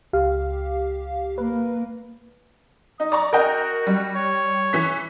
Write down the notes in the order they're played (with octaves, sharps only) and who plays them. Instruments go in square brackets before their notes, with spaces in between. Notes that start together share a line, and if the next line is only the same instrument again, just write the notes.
[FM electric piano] C#2 G4 F5
[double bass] A#3 [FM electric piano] B4
[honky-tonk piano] D#4 [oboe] D#6
[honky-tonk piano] D5 A#5 C#6
[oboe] F#4 [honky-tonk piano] A#4 D#5 G5
[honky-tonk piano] G3
[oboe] C#5
[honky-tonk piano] E3 B6